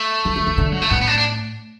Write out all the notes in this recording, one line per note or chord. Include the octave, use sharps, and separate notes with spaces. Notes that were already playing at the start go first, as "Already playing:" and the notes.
Already playing: A3
E3
E3
E3
D3
F#3
A3
A2 B3
B3
D4
D4